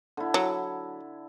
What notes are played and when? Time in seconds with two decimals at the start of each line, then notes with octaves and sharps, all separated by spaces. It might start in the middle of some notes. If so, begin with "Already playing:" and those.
0.17 D3 E4
0.34 F#3